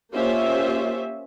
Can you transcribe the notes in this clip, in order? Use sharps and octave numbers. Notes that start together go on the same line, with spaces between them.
A#3 C#4 F4 G4 C5 E5